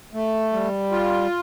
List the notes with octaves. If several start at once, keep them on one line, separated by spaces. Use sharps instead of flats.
A3
G3
F4